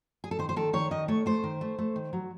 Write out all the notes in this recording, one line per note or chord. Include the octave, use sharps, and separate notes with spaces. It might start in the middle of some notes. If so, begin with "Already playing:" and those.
G#4
A4
D#3 C5
C5
D#3 A4
D#3 C#5
D#3 D#5
A3 C#5
A3 C5
D#3
A3
A3
D#3
F#3